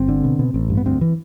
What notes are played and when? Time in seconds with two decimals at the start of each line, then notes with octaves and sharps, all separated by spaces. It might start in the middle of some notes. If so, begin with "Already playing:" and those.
Already playing: G1 C4
0.09 D3
0.24 B2
0.39 B2
0.54 A1
0.70 G2
0.77 B3
0.86 D2 C4
1.01 E3